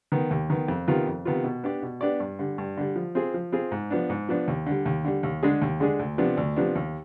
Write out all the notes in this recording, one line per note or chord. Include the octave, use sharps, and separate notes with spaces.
D#3 B3
D#2
D#3 B3
F2
C3 D#3 B3 F4
F2
C3 D#3 B3 F4
B2
B3 D4 G4 D5
B2
B3 D4 G4 D5
G2
D3 G3
G2
D3 G3
F3
C4 F4 G#4
F3
C4 F4 G#4
G#2
F3 B3 D4
G#2
F3 B3 D4
D#2
D3 G3
D#2
D3 G3
D#2
D3 G#3 D4 G#4
D#2
D3 G#3 D4 G#4
D2
C3 F3 B3 D4
D2
C3 F3 B3 D4
D#2